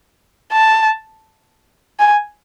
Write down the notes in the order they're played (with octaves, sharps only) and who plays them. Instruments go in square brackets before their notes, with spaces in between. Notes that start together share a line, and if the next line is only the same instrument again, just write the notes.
[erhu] A5
G#5